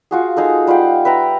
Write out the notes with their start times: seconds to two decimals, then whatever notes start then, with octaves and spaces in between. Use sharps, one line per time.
0.11 F4 F#4 G#4
0.36 G#3 D#4 G#4 A4
0.67 G3 F4 F#5 G5
1.05 B4 E5 G5 A#5